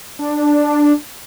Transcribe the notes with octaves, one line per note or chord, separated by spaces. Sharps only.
D4